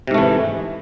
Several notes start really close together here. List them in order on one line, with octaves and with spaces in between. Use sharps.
C3 G#2 A3 E3